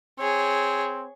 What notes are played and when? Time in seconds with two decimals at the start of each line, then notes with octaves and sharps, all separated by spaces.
0.19 C4 G#4 C#5